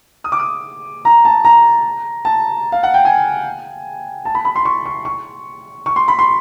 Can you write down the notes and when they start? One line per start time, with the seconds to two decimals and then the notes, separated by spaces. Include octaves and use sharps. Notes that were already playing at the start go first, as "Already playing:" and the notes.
0.24 D#6
0.32 D6
0.40 D#6
1.05 A#5
1.25 A5
1.45 A#5
2.25 A5
2.72 F5
2.83 F#5
2.94 G5
3.05 G#5
4.25 A5
4.35 B5
4.45 B5
4.56 C6
4.65 C#6
4.86 C#6
5.05 C#6
5.86 C#6
5.96 C6
6.08 B5
6.19 C6